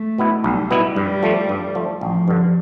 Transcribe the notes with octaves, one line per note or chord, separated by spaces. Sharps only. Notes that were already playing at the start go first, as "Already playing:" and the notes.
Already playing: A3
B2 B3 E4
B1 G3
B2 B3 E4
G2 G3
F3 A3
G2
F3 A3
A1 F3
G2 D3